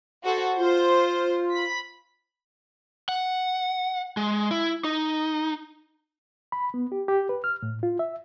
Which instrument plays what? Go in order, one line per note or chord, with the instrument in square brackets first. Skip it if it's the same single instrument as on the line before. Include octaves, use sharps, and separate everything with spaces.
[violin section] F#4 A4 C5
[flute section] F4 [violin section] C5
[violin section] B5 B6
[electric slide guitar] F#5
G#3
E4
D#4
[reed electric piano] B5
B3
G4
G4
B4
F6
A2
F4
E5